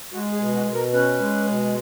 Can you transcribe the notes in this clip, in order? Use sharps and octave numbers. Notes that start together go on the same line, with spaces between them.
G#3 F#4
G#4
B2
F#4
B2
A#4
C#4 B4
G#3
B2